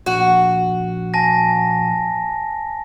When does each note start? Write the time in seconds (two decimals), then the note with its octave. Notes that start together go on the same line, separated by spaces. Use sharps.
0.06 A#1 F#4
1.14 G#5 A5 A#6